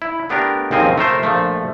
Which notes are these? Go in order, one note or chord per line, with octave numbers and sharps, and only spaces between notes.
E4
A3 B3 D4 G4 A#4
D#2 C#3 F3 C4 D#5 G#5
A3 A#4 C5 E5
A#1 F3 A3